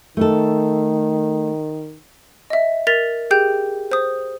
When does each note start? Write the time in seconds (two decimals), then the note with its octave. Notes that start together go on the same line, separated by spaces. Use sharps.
0.17 D#3 A3 A4
2.50 D#5 E5
2.87 A#4 A6 B6 F7
3.31 G4 G#4 G5 G6
3.92 C5 D#6